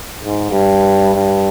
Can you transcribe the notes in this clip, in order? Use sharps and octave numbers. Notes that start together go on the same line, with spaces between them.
G#2
G2
G2